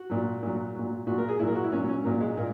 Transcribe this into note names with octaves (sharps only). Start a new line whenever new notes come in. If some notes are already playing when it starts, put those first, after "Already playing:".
Already playing: F#4
A#2 F#3
A#2 F#3
A#2 F#3
A#2 F#3 F#4
A#4
G#4
A#2 F#3 E4 A#4
F#4
E4
A#2 F#3 C#4
C#4
A#2 F#3 A#3
G#3
A#2 A#3